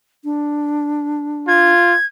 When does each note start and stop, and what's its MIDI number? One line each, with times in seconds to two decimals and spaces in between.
0.24 1.73 62
1.48 1.95 65
1.48 2.06 92